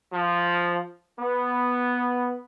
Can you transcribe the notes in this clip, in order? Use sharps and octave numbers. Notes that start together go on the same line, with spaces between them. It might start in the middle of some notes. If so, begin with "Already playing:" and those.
F3
B3